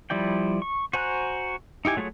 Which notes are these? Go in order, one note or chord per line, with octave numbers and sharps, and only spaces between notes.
F3 G3 E4 D5 G5
C#6
F#4 C5 G#5 A#5 F#6
D#4 E4 G4 G#5
F#3 A3 F4 G#4 C#5